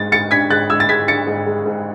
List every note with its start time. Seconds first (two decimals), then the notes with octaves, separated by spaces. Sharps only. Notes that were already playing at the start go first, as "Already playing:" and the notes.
Already playing: G#2 G#3 A6
0.12 G#2 A6 C#7
0.31 D4 G#6 B6
0.50 G#2 F#6 A6
0.70 G#3 E6 G#6
0.80 A6
0.89 G#2 G#6 B6
1.08 D4 A6 C#7
1.27 G#2
1.46 G#3
1.66 G#2